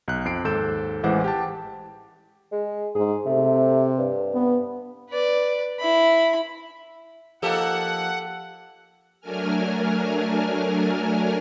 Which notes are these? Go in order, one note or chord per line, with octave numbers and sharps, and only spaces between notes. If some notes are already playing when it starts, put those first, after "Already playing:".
B1 F#6
F2 C7 D7
D#2 G#2 A4 G6 E7
A1 E3 G#3 C5 F#5 D6
G4 G5 A5
G#3
G#2 G#4
C3 A3
G2
B3
B4 D5
E4 B5
F3 A#3 D#4 G4 A4 F#5
F#3 A3 D4 A#4 G#5 F6